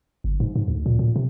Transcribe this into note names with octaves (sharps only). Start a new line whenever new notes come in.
G1
G#2
G#2
D2
A#2
A#2
C3